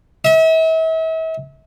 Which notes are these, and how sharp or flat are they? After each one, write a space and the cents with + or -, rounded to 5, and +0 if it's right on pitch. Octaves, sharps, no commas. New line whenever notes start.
E5 -40